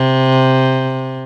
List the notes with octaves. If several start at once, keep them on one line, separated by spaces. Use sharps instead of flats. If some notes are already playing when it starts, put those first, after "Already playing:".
Already playing: C3